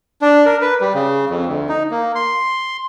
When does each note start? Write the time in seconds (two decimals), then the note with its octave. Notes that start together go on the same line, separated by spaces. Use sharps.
0.21 D4
0.45 A#4
0.61 B4
0.81 G3
0.94 C#3
1.30 F2
1.46 D2
1.69 D#4
1.91 A#3
2.15 C6